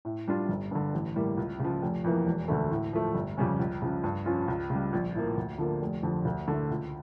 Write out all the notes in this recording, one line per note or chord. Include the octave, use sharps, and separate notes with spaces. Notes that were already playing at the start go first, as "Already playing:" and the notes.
A2
G3 D4 F4
G1
G2 D3
A1
A2 G3 A#3
C#2
C#3 F3
F1
F2 E3 A#3
E1
D2 D3 A3
A2
F3 A3
G1
F2 C#3 G3 C#4
C#2
C#3 F3
G2
F3 C#4 F4
C#2
C#3 G3
A#1
A2 F3 A#3
D2
D3 F3 A#3
F1
F2 D3 F3
D2
D3 A3 E4
C#2